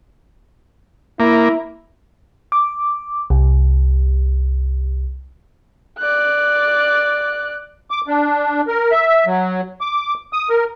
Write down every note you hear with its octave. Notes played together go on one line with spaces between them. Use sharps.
A#3 E4
D6
C2
D5 F#6
D6
D4
A#4
E5
F#3
D6
D#6
A#4